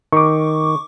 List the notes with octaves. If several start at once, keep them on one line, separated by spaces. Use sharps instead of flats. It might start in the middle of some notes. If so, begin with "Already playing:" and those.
D#3 C#6 D6